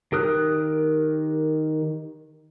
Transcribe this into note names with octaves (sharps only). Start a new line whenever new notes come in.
D#3 G4 A#4 D#6 F#6